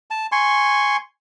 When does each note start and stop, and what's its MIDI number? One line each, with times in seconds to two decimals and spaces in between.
0.11 0.26 81
0.32 0.97 80
0.32 0.97 84
0.32 0.97 85